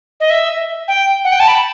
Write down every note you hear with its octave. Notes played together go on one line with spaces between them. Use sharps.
D#5
E5
G5
F#5
G5
A5
B5